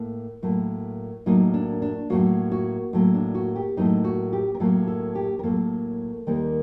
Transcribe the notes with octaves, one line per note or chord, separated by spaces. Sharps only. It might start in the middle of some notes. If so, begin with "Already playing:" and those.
Already playing: A2 A#3
A2 F#3 A#3
A2 F#3 A#3 D#4
D4
D4
A2 F#3 A#3 F#4
F#4
A2 F#3 A#3
D4
F#4
G4
A2 F#3 A#3 D#4
F#4
G4
A#4
A2 F#3 A#3 A4
A4
G4
A#4
A2 F#3 A#3 A4
D#2 D#3 G3 A#3